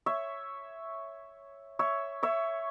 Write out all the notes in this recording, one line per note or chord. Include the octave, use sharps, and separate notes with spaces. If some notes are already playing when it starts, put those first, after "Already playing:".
C#5 E5
C#5 E5
C#5 E5